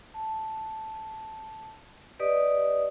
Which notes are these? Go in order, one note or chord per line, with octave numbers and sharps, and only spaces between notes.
A5
G4 B4 D5 D#5 D#6